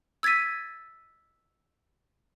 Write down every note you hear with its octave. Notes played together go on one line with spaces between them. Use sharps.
E6 G#6 A6 B6 D#7